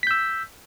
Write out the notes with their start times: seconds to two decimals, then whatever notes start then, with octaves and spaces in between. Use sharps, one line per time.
0.03 B6
0.07 G6
0.11 E6